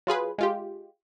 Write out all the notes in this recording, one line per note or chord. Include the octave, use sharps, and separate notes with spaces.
F#3 F4 G#4 B4
G#3 F4 G4